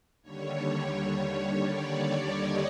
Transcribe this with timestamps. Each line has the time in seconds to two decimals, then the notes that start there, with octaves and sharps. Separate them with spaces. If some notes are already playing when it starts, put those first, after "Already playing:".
0.22 D#2 D3 G3 C#5
1.62 D5
2.32 D#5